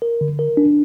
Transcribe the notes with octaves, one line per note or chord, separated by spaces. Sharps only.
A#4
D3
A#4
D4